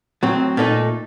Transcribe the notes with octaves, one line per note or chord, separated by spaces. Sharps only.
A2 F#3 C4
A#2 A3 D#4